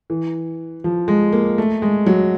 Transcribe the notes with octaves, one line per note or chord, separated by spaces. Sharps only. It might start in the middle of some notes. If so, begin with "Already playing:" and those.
E3
F3
G#3
A#3
A3
G#3
F#3